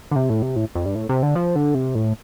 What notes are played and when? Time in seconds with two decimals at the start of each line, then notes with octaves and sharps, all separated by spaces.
0.11 D3
0.16 C3
0.30 A2
0.42 C3
0.56 A2
0.75 F2
0.86 G2
0.95 A2
1.09 C3
1.23 D3
1.35 F3
1.56 D3
1.75 C3
1.95 A2